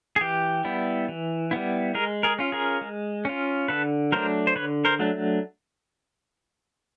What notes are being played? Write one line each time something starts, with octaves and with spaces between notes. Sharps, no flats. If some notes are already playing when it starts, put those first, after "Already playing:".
G#4
E3 G4
G3 B3 E4
E3
G3 B3 E4
G#3 G#4 A#4
G#4 A#4
C#4 F4
G#4 A#4
G#3
C#4 F4
D3 A4 B4
F#3 A3 D4 A#4 C5
C5
D3 B4 C#5
A#4 C5
F#3 A3 D4